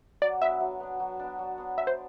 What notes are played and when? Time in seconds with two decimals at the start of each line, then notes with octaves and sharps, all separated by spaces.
0.22 F#3 D5
0.41 B3 D4 E5
0.60 F#3
0.80 B3 D4
1.00 F#3
1.19 B3 D4
1.39 F#3
1.58 B3 D4
1.78 D4 E5
1.87 C5